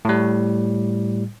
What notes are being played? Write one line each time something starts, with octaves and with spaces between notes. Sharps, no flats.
A2 G3